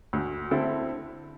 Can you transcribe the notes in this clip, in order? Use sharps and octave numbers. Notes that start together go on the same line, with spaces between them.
D2
D3 C4 E4 A4